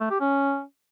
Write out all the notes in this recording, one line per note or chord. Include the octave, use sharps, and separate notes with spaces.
A3
G4
C#4